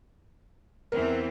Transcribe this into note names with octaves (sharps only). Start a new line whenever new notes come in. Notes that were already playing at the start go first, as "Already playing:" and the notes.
E2 E3 C4 A#4